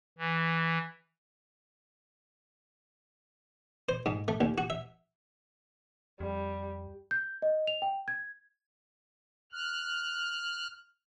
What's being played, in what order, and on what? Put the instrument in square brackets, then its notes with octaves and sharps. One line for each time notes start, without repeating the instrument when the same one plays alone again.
[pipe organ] E3
[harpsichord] C5
G#2
A3
D#2
F#4
E5
[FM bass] F2 [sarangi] G3
[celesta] G6
D#5
F7
G5
G#6
[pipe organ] F6 F#6